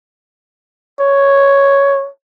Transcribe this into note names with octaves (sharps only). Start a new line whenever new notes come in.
C#5